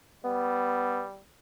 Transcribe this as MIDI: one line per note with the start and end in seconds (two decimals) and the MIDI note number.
0.24 1.21 55
0.24 1.03 59